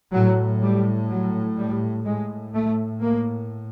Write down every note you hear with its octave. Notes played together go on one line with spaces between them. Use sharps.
A2 F#3
G3
F#3
G3
A2 G#3
A3
A#3